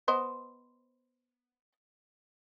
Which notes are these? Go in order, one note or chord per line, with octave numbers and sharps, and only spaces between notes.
B3 C5 D#5